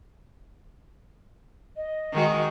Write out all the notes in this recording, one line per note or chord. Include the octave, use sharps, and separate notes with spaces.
D#5
D#3 G#3 F#4